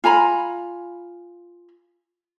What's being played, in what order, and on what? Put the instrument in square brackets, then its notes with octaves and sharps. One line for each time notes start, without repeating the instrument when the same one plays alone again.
[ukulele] F4 G#5 A#5 B5